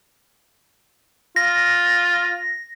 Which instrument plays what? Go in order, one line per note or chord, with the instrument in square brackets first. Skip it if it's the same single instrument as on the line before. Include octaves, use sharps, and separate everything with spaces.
[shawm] F4 [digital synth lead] A#6